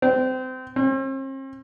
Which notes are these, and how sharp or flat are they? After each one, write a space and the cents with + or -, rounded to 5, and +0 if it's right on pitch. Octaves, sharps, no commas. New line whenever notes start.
C4 -25
C4 +45